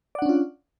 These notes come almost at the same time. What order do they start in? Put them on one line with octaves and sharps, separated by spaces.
D5 F#5 D4 C#4 F4